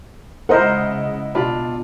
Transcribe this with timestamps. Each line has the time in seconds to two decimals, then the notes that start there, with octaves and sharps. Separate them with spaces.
0.49 C#3 G#3 E4 A#4 C5 D#5 F#5
1.35 B2 D4 F4 D5 B5